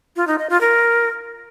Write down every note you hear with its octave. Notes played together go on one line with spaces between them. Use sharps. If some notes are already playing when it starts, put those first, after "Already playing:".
F4
D#4
D#5
F4
A#4